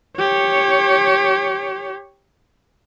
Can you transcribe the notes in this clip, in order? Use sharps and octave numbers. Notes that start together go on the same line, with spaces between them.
G4 C#5